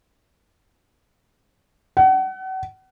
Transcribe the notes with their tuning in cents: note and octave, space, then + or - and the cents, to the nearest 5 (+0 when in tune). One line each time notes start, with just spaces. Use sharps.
F#5 +35